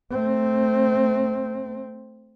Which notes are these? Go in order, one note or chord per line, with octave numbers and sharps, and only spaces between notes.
A3 C4